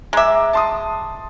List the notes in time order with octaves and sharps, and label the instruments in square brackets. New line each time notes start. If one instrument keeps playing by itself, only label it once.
[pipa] G#3 E5 [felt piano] A#5 D6
[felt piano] A5 C6 D#6